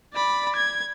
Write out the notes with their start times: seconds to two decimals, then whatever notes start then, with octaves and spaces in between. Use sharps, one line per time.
0.14 D5 B5
0.56 G#6